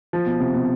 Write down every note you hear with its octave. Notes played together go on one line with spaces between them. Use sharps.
F3
B2
C3
B2